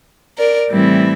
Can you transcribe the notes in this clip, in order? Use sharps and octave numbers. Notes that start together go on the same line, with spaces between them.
A#4 D5
A2 E3 G3 C4 E4